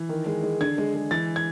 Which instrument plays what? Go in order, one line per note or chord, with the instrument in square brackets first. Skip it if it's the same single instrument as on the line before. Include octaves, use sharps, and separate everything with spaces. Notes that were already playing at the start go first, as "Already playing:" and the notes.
Already playing: [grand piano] E3
D#3
G#3
G#3
D3 G#6
G#3
G#3
E3 A6
G#6